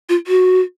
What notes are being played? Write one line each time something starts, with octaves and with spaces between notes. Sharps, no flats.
F4
F#4